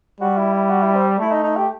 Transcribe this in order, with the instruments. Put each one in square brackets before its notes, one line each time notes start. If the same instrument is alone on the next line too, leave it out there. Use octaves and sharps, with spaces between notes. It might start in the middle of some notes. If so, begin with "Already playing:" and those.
[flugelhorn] G3 [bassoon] F#4
[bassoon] E4
E4
F#4
E4
C4
[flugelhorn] A3 [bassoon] E4
[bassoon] D#4
D#4
G4